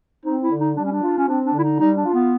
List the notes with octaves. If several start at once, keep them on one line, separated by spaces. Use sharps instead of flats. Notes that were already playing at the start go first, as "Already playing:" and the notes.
C4 D#4
E4
D3
D#4
G3 D4
C#4
D4
F4
C#4
C4 D4
D4
D3 E4
D#4
G3 D#4
D4
F4
B3